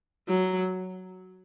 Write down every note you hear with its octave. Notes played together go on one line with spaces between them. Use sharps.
F#3